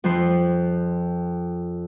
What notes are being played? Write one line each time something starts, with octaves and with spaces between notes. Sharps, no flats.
F2 F3 C6